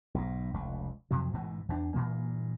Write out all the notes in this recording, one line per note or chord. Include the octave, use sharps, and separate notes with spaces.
B1 G#2
F1 C#2
F2 C3 F3 F#3
A1 G#2 B2 E3
E2 B3 D4
G2 A#2 E3 A#3